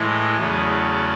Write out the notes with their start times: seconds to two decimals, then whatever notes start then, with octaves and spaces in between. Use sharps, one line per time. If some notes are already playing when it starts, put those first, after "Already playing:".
Already playing: A2 E3 G#3 D#5
0.37 E2 C#3 F#3 A3